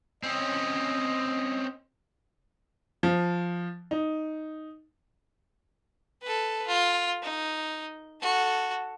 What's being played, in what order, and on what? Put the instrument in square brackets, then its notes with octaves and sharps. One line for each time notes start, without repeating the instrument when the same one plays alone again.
[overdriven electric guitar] C4 C#4 [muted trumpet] D#5
[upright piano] F3
D#4
[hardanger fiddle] A4 B4
F4
D#4
F#4 A4